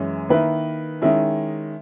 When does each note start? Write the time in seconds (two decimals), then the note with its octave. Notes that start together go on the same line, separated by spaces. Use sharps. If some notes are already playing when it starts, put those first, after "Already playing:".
Already playing: F#2 E3 G#3 C#4
0.29 D#3 A#3 E4 B4
1.02 D#3 G#3 C#4 E4